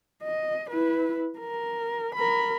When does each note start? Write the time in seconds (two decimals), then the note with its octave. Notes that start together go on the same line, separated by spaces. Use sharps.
0.23 D#5
0.70 E4 B4
1.39 A#4
2.15 A#4 B5